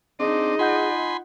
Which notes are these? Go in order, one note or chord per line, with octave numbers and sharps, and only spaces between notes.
C4 D4 D#4 G#4 D#5
F4 F#5 G#5 B5 C6 G6